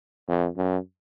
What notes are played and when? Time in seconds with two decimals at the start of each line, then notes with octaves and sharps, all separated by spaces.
0.28 F2
0.57 F#2